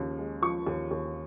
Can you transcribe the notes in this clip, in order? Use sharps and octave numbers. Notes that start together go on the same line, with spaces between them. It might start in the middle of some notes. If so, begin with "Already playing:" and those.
Already playing: D#2 C#3 F3
G#3
F3 C#6
D#2
D#2